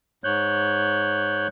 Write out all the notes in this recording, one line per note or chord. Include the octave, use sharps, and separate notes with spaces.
G#2 C#5 F#6 G6